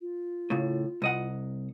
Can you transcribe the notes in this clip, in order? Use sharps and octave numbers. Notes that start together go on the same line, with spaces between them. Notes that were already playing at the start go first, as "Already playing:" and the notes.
F4
A2 C#3
C2 D#5 F#5